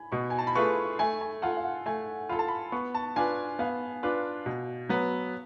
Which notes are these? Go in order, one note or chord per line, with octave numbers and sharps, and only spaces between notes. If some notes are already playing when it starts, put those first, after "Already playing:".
Already playing: G#5 B5
B2 C#6
G#5
A5
B5
A3 F4 G#4 B4 C#6
A3 G#5
G#5
F4 A4 F#5
F5
F#5
A3 G#5
F4 A4 B5
A5
B5
B3 C#6
A5
D4 F4 B4 G#5
B3 F5
D4 F4 B4
B2
F#3 B3